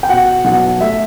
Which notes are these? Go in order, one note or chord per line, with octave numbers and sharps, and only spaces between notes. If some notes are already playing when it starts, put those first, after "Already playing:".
G5
B2 F#5
B1 F#5
A3 E5